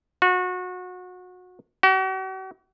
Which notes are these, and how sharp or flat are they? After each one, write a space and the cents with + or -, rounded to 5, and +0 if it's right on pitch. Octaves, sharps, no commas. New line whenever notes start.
F#4 -25
F#4 +45